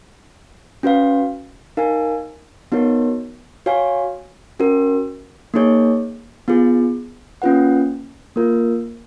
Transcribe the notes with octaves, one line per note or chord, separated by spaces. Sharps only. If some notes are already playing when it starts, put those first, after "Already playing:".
C#4 F#4 B4 F5
D#4 A#4 F5 G#5
B3 D#4 F#4 A#4 C#5
F#4 C#5 F5 G#5
C#4 F#4 A#4
A#3 D#4 G#4 C#5
B3 F4 G#4
A#3 C#4 F4 B4 F#5
A#3 F4 A#4